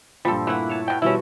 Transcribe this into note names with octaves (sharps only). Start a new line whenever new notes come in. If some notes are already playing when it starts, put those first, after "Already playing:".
G2 A#2 F3 G3 A4
E3 A3 A#3 E4 F#5
C#5 A5
B2 G5
B2 E3 F3 G3 C#4 E4 F#4